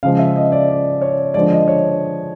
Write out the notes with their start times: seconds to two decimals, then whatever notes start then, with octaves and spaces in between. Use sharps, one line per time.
0.03 C#3 F3 G#3 F5
0.19 E5
0.36 D#5
0.52 D5
0.69 D5
1.01 C#5
1.34 D3 F3 G#3 D5
1.51 D#5
1.68 C#5